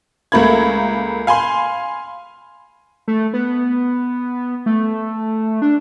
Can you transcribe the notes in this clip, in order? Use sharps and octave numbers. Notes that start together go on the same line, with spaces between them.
C#2 A3 A#3 B5 G#6
F5 G#5 B5 C6
A3
B3
A3
D4